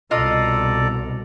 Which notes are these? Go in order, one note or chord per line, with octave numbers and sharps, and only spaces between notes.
C2 B2 F4 A4 D5 D#5 A#5